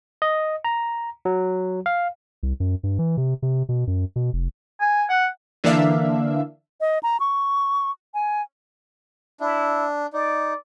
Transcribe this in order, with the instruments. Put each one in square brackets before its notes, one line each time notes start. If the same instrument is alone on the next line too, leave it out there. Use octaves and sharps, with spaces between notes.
[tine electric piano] D#5
A#5
F#3
F5
[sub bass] C2
F#2
G2
E3
C3
C3
B2
F#2
B2
F1
[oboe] G#5
F#5
[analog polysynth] D3 E3 A#3 D4 E5 F5
[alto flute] D#5
A#5
C#6
G#5
[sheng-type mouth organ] D4 [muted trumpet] E4
[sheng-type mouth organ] D#4 [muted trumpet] D5